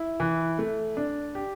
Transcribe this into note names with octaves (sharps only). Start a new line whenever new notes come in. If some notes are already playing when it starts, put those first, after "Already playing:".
Already playing: E4
E3
A3
D4
G4